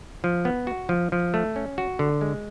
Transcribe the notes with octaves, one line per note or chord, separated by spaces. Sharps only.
F3
B3
F#4
F3
F3
A3
C#4
F#4
D3
G#3